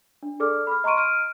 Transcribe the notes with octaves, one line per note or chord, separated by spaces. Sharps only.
D4
G#4 A4 D5 D6 F6
B5 F6
D#5 A#5 C6 C#6 D7 D#7
F6 D7 D#7